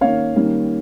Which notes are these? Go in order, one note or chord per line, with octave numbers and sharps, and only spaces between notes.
D#3 A#3 C#4 C#5 F5
D#3 G3 A#3 C#4